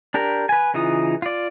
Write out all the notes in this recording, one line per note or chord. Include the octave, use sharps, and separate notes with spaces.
D4 G4 A#4
B4 G#5
C#3 E3 D#4 F4 D#6
F4 D5